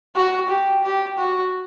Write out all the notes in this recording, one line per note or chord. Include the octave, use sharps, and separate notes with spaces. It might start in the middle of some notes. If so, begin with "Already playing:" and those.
F#4
G4
G4
F#4